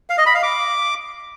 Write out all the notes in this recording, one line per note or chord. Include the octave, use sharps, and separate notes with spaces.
F5
D#5
B5
F5
D6